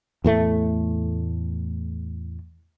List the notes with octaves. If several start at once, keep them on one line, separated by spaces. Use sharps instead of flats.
E2 A2 A3